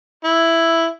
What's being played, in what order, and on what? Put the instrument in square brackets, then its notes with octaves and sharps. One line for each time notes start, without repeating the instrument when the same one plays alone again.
[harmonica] E4